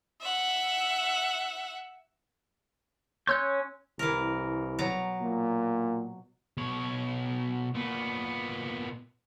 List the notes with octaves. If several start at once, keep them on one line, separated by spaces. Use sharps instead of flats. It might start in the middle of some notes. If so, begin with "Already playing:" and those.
E5 F#5
C#4 C#5 C6 E6 F#6 G6
C2 E3 A#4
B2 F#3 A#5
A#2
B2 C#5
A#2 B3